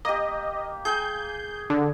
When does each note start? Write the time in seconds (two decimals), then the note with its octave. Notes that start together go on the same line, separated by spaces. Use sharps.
0.05 A#3 G4 D#5
0.85 G#4 G5 G#5 G6
1.70 D3